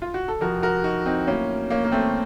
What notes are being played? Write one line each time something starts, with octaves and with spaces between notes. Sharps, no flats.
F4
F#4
A4
F2 C3 F3 F#4 A#4
F#4 A#4
D#4 F#4
C4 D#4
A2 F#3 A#3 C#4
A#3 C#4
A#3
A3 C4